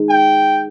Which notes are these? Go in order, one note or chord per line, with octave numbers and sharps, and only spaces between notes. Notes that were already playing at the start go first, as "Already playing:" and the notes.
Already playing: G#3 D#4 G#4
G5